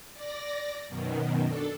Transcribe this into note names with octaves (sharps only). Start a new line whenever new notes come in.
D5 A#6
F#2 B2 D#3
D4 A4